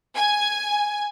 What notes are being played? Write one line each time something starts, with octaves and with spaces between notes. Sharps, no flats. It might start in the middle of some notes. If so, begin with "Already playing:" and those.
G#5